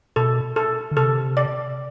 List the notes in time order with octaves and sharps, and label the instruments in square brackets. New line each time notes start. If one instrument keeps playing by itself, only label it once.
[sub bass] B2 [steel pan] A4
[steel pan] A4
[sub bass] D3
[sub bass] C3 [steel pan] A4
[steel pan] D5